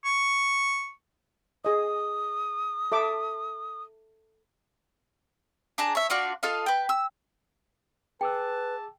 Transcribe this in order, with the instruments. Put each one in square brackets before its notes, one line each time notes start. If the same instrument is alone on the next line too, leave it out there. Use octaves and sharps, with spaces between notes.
[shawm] C#6
[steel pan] G#4 D#5 [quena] D#6
[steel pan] A4 E5 D6
[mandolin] D4 G#4 A5 A#5
C#5 E5
D4 F4 F#4 D5
F4 A4 D#5 F5
B4 G5
E6
[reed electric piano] G#4 D6 E6 [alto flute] B4 [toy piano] G5 [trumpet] A5